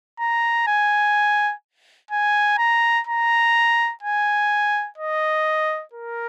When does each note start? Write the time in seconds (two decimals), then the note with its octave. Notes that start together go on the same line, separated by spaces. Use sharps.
0.20 A#5
0.67 G#5
2.11 G#5
2.58 A#5
3.07 A#5
4.03 G#5
4.98 D#5
5.93 A#4